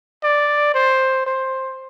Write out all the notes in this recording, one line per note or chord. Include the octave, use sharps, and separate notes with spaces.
D5
C5
C5